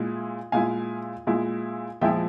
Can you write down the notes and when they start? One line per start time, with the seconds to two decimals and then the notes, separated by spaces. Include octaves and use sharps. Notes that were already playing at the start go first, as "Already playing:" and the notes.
Already playing: A#2 G#3 E4
0.52 A#2 G#3 E4 F5 G#5
1.27 A#2 G#3 E4
2.01 A#2 F3 G#3 E4 E5 G5